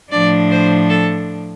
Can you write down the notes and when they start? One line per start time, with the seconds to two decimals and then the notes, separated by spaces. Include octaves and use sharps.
0.10 A2 F3 D4 D5
0.50 C5
0.89 A4